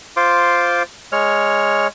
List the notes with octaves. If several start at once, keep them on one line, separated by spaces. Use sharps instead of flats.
F4 C5 D6
G#3 C#5 F6